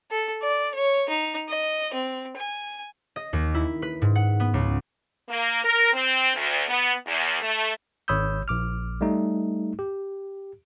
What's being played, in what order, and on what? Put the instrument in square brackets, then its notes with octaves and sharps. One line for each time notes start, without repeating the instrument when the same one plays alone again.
[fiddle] A4
D5
C#5
D#4
D#5
C4
G#5
[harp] D#5
D#2
E4
B4
G#2
F#5
B3
C#2
[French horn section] A#3
A#4
C4
D2
B3
E2
A3
[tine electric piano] G#1 C#5 B5 D#6 E6 G6
A#1 D6 F6
G3 A3 D#4
G4